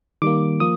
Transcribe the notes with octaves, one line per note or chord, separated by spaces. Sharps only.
D#3 G3 A#3 D6
F3 A#3 D#6